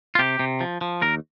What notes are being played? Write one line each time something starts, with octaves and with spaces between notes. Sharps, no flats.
F4
C3 G4
C3
F3
F3
D#2 A#4